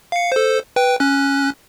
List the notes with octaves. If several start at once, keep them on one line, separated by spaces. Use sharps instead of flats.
F5 C#7
A4 C5
B4 G5
C#4 F#6